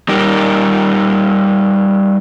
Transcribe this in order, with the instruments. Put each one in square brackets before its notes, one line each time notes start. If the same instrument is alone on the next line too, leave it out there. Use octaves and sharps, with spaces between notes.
[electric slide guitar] G3 D#4 G4 A#4